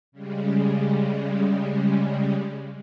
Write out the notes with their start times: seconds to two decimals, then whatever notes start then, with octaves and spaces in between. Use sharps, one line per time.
0.12 C#3 G3 G#3